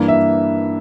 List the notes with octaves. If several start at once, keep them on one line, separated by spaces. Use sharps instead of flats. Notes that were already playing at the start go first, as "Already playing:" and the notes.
Already playing: G2 E3 A#3
E5